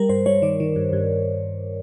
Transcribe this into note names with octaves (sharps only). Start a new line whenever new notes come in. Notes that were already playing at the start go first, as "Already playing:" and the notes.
Already playing: G3 A#4
G2 C5
G3 C#5
D#3 D5
D#3
G2
G2